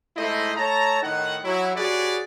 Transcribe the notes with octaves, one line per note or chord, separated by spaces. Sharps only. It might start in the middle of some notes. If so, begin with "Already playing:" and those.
G#2 A3 E4 C5 D#5
A3 C#5 A5 A#5
A2 D#3 D#4 F#5
F#3 E4
G2 F#4 G#4 B4 C#5 D5